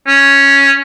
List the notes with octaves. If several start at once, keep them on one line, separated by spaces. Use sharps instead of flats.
C#4